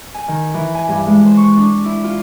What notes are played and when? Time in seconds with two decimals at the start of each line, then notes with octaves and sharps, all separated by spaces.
0.14 G#5
0.28 D#3
0.54 E3
0.75 G#5
0.89 G2
1.07 G#3
1.26 C5
1.37 C#6
1.57 D4
1.85 E4
2.04 F4